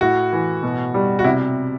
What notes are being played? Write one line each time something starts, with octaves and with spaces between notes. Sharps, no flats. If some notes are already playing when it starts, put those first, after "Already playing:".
A2 F#4
E3
B2
G3
F#4
C3 E4